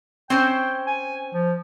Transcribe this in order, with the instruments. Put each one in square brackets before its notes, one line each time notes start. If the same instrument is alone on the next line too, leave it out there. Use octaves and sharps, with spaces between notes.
[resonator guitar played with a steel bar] C4 C#4 C5 [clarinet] G5
[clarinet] G#5
F3